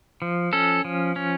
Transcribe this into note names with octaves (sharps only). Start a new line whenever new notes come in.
F3
C#4 A4
F3
C#4